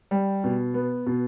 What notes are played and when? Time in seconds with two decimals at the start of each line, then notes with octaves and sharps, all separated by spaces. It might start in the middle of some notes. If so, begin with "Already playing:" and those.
0.11 G3
0.44 B2
0.74 B3
1.06 B2